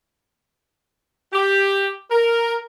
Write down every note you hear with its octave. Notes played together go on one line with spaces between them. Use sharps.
G4
A#4